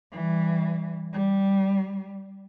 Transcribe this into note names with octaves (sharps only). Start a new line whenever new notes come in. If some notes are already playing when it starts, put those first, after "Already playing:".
E3 G3
G3